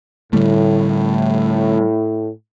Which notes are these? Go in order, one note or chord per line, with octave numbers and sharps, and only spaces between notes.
A2 D3 G3 A3